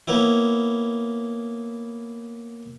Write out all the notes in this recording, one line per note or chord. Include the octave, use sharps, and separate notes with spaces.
A#3 B3 C#4 E4